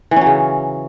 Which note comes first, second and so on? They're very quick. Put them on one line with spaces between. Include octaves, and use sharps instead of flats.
E3 C#4 F#3 C#3